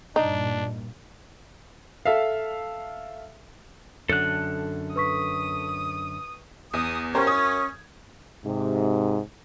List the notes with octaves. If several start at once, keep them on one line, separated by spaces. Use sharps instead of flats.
G2 A#2 D4 D#4
A4 E5 F5
F#2 D3 A4 F#6
B4 C#6 D#6 B6
E2 D#6
F#2 C#4 G4 A#4 C5
D#6 G#6
G#2 C3